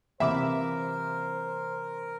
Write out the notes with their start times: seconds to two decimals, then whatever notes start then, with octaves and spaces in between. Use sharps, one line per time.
0.20 C3 E3 A#3 A#4 C5 E5 B5 D6